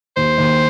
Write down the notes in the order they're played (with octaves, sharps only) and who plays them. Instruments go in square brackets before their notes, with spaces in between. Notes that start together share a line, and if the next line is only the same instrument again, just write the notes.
[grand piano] D#2 [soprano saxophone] C5
[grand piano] D#2